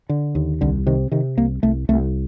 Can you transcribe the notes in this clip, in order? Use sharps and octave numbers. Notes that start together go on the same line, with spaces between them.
D3
D#2
C2 D3
C3 D#3
C3 D#3
C2 A#3
C2 A3
C2 A3